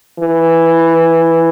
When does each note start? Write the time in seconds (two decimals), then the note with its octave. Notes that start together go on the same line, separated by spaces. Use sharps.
0.19 E3